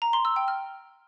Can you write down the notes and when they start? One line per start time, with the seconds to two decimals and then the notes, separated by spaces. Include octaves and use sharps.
0.02 A#5
0.13 C6
0.25 E6
0.36 G5
0.48 F6